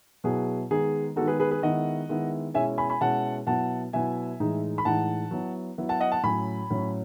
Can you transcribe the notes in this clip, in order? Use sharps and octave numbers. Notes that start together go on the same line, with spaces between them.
B2 F#3 B3 E4 G#4
D#3 G#3 B3 D#4 G#4
D#3 G#3 B3 D#4 F#4 A4
G#4 B4
G#4 B4
G#4 B4
D#3 G#3 B3 E4 D#5 F#5
D#3 G#3 B3 E4
B2 G#3 C#4 E4 E5 G#5
G#5 B5
G#5 B5
B2 G#3 C#4 E4 F#5 A5
B2 F#3 B3 E4 F#5 A5
B2 F#3 B3 E4 E5 G#5
A2 E3 G#3 D#4
B5
A2 E3 G#3 D#4 F#5 A5
F#3 B3 E4
F#3 B3 E4
F#5 A5
D#5 F#5
F#5 A5
A2 F#3 C#4 G#5 B5
A2 F#3 C#4